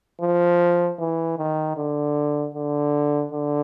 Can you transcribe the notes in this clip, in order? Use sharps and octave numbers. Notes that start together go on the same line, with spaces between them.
F3
E3
D#3
D3
D3
D3